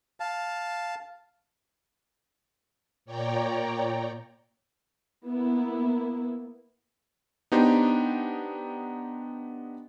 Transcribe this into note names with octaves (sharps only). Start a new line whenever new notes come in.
F5 A5
A#2 C#5 D5 G5 A#5
A#3 B3 E4
B3 D4 D#4 G4 C5